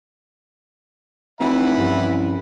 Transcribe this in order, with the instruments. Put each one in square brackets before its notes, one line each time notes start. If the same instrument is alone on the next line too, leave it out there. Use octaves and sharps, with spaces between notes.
[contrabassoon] F1 [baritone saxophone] E3 [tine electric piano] C4 [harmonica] E5 F#5 B5
[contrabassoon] C2 [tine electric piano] G2 F3 C#4